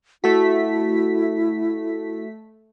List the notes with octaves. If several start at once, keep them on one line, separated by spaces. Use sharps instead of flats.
A3 E4 F#4 B6